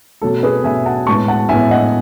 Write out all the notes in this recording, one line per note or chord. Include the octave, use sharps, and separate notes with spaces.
B2 F#3 A3 A4
G#4 B4
B2 F#3 A3 E5 G#5
F#5 A5
A2 G#3 B3 A5 C#6
F#5 A5
A2 G#3 B3 E5 G#5
D#5 F#5